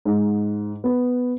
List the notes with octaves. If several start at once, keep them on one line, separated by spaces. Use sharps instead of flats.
G#2
B3